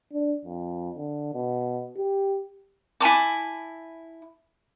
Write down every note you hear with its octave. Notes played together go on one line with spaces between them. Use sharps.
D4
F2
D3
B2
G4
E4 G#5 A5 D6